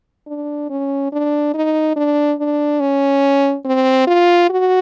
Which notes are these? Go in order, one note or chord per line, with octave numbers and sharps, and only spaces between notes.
D4
C#4
D4
D#4
D4
D4
C#4
C4
F4
F#4